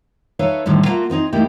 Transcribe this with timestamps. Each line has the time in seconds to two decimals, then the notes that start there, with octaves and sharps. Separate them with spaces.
0.39 D#4 A4 B4 C#5 E5 F5
0.66 A2 D3 D#3 G3 G#3
0.85 A3 A#3 F4 F#4 A#4
1.10 B3 C4 D#4 G#4
1.32 F3 A3 A#3 D#4 E4 G4